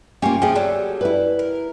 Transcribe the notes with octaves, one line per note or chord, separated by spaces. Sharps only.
A#3 C#4 F4 G4
F3 A3 G#4 G5
F#3 G3 A4
E4 B4
A#4